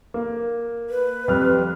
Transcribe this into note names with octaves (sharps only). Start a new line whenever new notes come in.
A#3
B4
F2 G3 F6